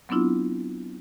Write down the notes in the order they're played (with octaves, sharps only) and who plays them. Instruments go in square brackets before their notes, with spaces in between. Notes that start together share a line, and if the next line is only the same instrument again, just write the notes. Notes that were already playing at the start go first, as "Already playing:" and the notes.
[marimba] F#3 B3 C4 D4 E4 F4